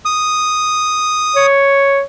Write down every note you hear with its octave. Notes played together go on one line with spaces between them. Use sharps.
D#6
C#5